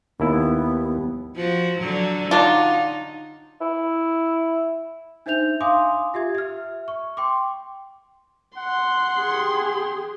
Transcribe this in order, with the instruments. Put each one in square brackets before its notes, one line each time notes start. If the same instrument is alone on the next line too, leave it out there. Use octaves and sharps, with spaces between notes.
[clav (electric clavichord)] D#2 E4 [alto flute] B3
[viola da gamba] F3 F#4
D3 F#3
[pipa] F#3 D4 F4 [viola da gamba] D#4
[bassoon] E4
[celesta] D4 D#4 C5 E5 G6 F7
F5 G#5 C6 D6 D#6
F4 G4 E5 G#6
E5 F6
C#6
G5 C6 D6
[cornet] F#5 [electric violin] C6
[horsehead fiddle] G4 G#4